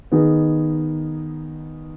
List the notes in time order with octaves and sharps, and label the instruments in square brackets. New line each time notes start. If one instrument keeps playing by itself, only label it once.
[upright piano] D#3 B3 D#4 G#4